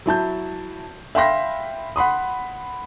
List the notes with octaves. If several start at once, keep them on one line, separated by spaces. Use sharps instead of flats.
F#3 E4 A5 G6
E5 F5 G5 B5 C6 A#6
F#5 B5 C6 D#6